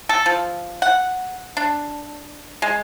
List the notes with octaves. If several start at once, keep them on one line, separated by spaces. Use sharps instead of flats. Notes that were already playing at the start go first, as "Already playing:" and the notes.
A4
F3
F#5
D4
G#3